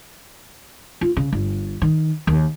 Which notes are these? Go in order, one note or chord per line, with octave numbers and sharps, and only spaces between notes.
F4
C#3
G1
D#3
D#2